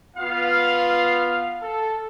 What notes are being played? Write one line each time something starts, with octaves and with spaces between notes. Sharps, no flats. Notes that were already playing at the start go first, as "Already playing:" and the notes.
B3 F4 F5
A4